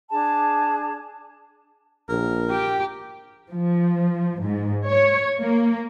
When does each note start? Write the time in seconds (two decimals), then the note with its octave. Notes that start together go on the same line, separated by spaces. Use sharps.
0.10 D4 G#4 A5
2.09 A#1 A#4
2.50 G4 G5
3.51 F3
4.42 G#2
4.90 C#5
5.39 A#3